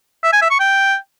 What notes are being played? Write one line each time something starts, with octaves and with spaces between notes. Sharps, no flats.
E5
G#5
E5
C#6
G5